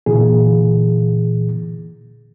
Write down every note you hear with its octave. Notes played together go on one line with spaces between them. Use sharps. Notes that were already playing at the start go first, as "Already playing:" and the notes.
A#2 D3 E3 G#4